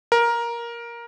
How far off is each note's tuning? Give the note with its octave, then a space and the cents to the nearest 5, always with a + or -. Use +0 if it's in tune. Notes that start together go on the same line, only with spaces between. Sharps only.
A#4 +10